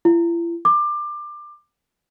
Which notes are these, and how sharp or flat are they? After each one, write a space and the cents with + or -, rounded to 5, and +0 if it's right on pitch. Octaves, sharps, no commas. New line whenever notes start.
E4 +45
D6 +20